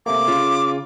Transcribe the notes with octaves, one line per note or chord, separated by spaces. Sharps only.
C3 A3 A#3 D6
C#3 F4